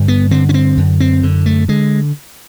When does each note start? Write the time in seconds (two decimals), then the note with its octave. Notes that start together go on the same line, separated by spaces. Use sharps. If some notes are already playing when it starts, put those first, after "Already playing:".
Already playing: G2 D3
0.08 B3
0.31 D3 C4
0.49 C#4
0.54 C4
0.77 F#2
1.00 C4
1.23 D3
1.46 A3
1.68 D3 G#3